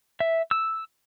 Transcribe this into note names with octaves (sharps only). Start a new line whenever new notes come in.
E5
E6